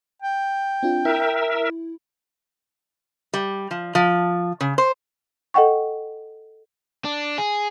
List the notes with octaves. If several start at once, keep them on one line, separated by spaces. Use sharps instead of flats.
G5
C4 D4 F4
E4 A#4 E5
G3
F3
F3
C#3
C5
A4 D#5 F#5 G5 C#6
D4
G#4